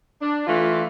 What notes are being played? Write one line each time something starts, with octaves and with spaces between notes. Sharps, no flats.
D4
E3 A3 F4